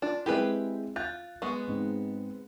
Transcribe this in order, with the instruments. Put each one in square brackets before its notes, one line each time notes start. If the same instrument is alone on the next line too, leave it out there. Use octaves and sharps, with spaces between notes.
[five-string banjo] D4 [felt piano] F4
[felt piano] G#3 C4 E4 [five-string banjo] G4 G#4 B4
[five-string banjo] F4 [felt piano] F#6 G6 A6
[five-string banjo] G#3 B3 [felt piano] C#6
[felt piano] G#2 C4